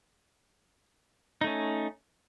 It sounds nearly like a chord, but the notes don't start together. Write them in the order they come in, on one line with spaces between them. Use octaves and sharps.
D#4 A3 C#4